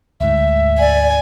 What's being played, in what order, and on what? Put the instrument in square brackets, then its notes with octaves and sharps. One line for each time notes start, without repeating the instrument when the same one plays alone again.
[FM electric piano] D2 G#2 [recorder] E5
[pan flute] D5 [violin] G#5